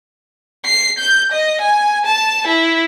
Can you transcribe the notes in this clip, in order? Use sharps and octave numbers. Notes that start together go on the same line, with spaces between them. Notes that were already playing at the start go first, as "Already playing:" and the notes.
C7
G6
D#5
G#5
A5
E4